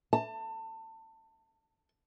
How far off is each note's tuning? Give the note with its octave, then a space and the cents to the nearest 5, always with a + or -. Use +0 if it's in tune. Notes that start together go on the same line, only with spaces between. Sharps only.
A5 +25